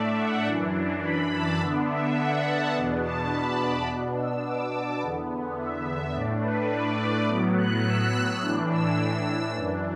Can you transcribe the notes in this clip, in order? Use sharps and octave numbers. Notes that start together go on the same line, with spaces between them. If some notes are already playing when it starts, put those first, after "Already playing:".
Already playing: A2 A3 D4 D5 E5
F#5
F#2 E3 D4
B5
A5
D3 B3 D4 E5
E5
F#5
A5
E2 B2 B3 D4
A5
B5
D6
B2 B3 D4 F#6
E6
D6
A5
E2 D3 B3
E5
A2 A3 D4 D5
B4
D5
D5
A2 F#3 B3 D6
F#6
E6
E6
A2 E3 D4 F#6
E6
E6
E6
F#2 E3 D4